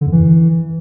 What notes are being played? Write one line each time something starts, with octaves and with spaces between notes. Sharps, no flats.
D3
F2
E3